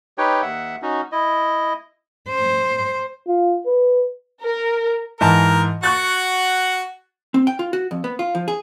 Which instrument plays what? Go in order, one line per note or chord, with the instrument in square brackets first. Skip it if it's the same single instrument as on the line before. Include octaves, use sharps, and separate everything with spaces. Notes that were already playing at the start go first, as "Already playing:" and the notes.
[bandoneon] D#4 G4 B4 C#5 G5
D#2 E5 F#5
C#4 D#4 F#4
E4 D#5
[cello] C5
[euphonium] F4
B4
[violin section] A#4
[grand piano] G#2 E3 A5 [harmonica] A#4
[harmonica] F#4 F#5 [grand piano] C#6 F#6 A6
[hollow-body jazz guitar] C4
G5
F4
F#4
F2
B3
F4
F3
G#4